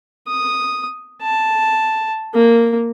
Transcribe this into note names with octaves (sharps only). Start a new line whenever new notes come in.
D#6
A5
A#3